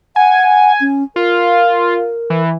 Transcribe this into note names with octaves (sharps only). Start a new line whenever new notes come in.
F#5 G#5
C#4
F4 A#4
E3